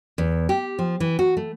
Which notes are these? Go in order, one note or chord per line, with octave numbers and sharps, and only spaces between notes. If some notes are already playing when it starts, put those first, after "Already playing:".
E2
G4
F3
E3
F#4
A3